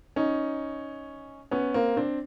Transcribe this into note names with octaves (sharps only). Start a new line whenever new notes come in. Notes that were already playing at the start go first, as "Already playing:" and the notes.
C#4 D#4
B3 C#4
A#3 C4
C4 D4